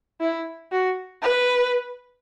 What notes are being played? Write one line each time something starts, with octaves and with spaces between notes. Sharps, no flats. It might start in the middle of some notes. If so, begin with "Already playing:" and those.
E4
F#4
B4